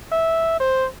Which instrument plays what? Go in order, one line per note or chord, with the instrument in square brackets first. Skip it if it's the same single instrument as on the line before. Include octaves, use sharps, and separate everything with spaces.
[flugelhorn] E5
C5